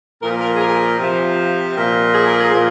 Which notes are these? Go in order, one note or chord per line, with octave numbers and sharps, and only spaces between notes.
A#2 F3 A#4
A#4
G#4
A#4
C3 F3
A#2 F3
G#4
A#4
G#4
A#2 F3